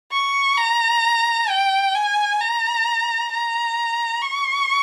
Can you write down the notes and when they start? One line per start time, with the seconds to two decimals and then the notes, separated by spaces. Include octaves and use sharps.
0.12 C#6
0.57 A#5
1.49 G5
1.95 G#5
2.40 A#5
3.32 A#5
4.22 C#6